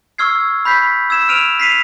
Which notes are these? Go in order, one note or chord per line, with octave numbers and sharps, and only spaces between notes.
C#6 E6 F6 G#6 C7
B5 G6 B6 C7
E6 G#6 E7
F6 D7 D#7 F7
B6 C7 D#7 F7